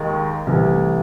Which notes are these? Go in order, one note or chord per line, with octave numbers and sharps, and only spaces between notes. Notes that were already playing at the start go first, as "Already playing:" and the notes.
Already playing: D#2 D#3 G#3
C2 C3 E3 A3